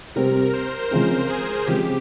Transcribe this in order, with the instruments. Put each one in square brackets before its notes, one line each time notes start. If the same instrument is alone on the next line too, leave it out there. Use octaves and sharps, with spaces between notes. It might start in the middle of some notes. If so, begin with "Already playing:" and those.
[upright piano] C3 G3 C4 G4 [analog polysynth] A#4
[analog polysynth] A#4
C5
C5
[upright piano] C#3 F3 G#3 C4 [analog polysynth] A#4
[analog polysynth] G#4
[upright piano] C#3 F3 G#3 C4 [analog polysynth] G4